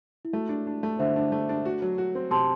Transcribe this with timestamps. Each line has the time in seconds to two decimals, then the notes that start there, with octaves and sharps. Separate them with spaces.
0.25 E4
0.33 A3 F#4
0.49 D4
0.67 D4
0.83 A3
0.99 D3 C5 E5
1.16 D4
1.32 A3
1.49 D4
1.65 F#4
1.82 F#3
1.98 F#4
2.15 C4
2.31 C3 A5 C6